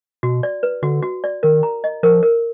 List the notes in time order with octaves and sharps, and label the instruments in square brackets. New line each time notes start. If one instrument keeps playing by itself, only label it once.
[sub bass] B2 [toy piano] F#4
[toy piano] D5
B4
[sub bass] D3 [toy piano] F#4
[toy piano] F#4
D5
[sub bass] D#3 [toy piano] A#4
[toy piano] A#5
D#5
[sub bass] F3 [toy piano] A#4
[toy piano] A#4